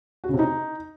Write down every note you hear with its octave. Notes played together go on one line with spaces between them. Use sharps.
F#4
C#3
C3
D#4